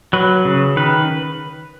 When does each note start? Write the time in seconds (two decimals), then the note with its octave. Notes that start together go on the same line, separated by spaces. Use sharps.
0.13 F#3 B4
0.45 C#3
0.77 D#3 B4